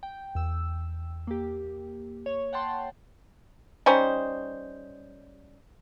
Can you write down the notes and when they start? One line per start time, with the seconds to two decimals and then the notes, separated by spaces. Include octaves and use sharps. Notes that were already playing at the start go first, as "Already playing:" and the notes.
0.03 G5
0.35 E2 E6
1.27 A#3 G4
2.26 C#5
2.53 F#5 G5 A5 C6
3.86 G3 C#4 D#4 C5